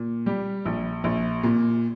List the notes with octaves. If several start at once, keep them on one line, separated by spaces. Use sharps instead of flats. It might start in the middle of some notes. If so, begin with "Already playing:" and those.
Already playing: A#2
G3 G4
A#1
A#1
A#2